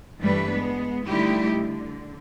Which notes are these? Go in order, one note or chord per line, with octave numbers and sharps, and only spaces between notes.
G2 E3 G3 A3 D4 B4
G#3 B3
D3 G3 A3 D#4 E4 G4
D3